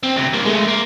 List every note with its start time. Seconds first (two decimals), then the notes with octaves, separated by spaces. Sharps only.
0.03 C4
0.16 D2 C3
0.33 G3 A#3
0.46 G#3 A3
0.68 A#3